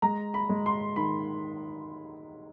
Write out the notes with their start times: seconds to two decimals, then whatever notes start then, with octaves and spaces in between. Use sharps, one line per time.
0.02 G#3 A#5
0.34 B5
0.49 G#3
0.66 C6
0.96 D#3 B5